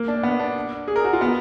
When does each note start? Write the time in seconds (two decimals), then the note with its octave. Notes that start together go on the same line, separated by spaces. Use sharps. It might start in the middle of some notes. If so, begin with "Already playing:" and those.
Already playing: A#3
0.08 D4
0.23 B3
0.40 D4
0.88 G#4
0.96 A#4
1.04 F#4
1.13 F4
1.21 B3